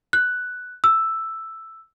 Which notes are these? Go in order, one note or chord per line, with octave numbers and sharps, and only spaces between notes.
F#6
E6